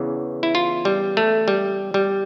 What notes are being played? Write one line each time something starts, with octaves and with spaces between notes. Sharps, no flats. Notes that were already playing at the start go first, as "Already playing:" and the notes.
Already playing: E2 C#3 E3
E4
F4
G3
A3
G3
G3